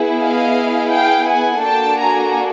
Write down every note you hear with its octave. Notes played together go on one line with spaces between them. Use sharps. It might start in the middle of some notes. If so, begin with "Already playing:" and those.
Already playing: B3 E4 G#4
D#5 F5
F5 G5
F#5 G#5
A#3 D4 F#4 A4 G5 A5
G#5 A#5